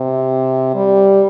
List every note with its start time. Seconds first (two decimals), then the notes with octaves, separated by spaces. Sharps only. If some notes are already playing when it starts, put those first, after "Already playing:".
Already playing: C3
0.75 G3